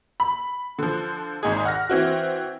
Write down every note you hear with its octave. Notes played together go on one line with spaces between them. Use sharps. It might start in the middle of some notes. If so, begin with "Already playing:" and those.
B5
D3 F3
G#1 G#2 D#4 G#4
F#5 F6 A#6
E3 C4 F#4